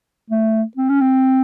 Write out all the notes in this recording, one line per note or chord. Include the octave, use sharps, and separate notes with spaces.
A3
C4
C#4
C4